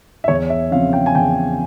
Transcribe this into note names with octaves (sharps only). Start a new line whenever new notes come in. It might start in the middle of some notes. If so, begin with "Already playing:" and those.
E5
E2 C#5
E5
C#3 F3 C4 F5
G5
G#5
E2 G5